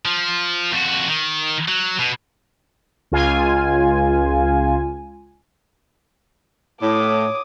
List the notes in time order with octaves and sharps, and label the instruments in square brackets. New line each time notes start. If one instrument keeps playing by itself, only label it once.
[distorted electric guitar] F3
F2 F#4
D#3
F#3
B2
[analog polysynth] C#2 F4 G#5
[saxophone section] A2 [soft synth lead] C#5 [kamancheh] D6 D#6